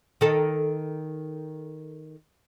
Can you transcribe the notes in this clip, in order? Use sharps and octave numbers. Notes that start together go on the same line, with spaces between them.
D#3 A4